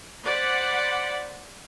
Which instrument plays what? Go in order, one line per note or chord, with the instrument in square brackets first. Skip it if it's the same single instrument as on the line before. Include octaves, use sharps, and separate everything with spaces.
[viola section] C5 D5 F#5 B5